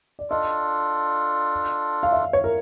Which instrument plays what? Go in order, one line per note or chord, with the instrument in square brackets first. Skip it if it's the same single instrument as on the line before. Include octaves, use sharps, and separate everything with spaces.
[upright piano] D5
[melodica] D4 F4 A4 [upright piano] D#5
[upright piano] F5
E5
C#5
A#4